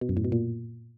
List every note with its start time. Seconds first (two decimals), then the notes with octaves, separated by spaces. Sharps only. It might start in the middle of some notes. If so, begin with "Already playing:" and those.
0.01 B2
0.09 F#2
0.17 A2
0.24 B2
0.32 A#2